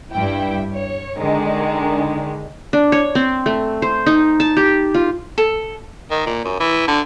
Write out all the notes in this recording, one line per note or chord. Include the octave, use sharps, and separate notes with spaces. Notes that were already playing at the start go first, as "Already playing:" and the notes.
G2 E4 G5
C#5
D3 D#3 G#3
D4
C#5
C4
A3
C5
D#4
A5
G4
F4
A4
D#3
A#2
F#2
E3
D3